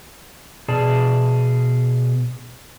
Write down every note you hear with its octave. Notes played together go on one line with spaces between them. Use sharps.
B2 G#4 D5 A5